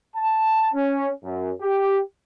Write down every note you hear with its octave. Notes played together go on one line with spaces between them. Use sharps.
A5
C#4
F#2
G4